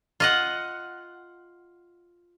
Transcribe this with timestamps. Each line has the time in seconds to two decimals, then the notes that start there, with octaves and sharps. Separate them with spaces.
0.20 F4 D#5 F#5